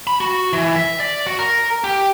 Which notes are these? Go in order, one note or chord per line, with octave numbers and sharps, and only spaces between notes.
B5
F#4
E3
E5
D5
F#4
A#4
G4